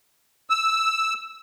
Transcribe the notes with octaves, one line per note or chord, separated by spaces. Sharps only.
E6